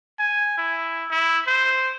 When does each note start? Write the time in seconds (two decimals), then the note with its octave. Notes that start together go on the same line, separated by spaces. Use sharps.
0.19 G#5
0.58 E4
1.11 E4
1.47 C5